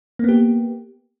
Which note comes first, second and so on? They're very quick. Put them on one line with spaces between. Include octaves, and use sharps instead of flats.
A#3 B3 G4